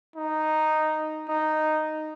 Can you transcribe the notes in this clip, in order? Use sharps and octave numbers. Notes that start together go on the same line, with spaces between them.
D#4
D#4